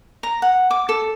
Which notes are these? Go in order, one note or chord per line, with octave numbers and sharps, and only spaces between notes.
A#5
F#5
D6
A4